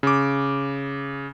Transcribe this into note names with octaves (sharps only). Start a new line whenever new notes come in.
C#3 D6